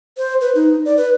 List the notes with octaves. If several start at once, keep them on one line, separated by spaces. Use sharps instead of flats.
C5
B4
D#4
D5
B4